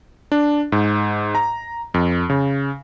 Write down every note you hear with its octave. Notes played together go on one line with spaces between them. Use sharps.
D4
G#2
A#5
F2
C#3